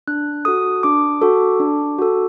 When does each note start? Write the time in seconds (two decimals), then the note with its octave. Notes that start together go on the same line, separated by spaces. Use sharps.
0.08 D4 F#6
0.45 F#4 A4 D#6
0.83 D4 D6
1.22 F#4 A4
1.60 D4
1.98 F#4 A4